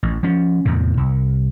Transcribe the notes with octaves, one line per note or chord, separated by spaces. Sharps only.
A1
F3 C#4
E2 A2 C3
C2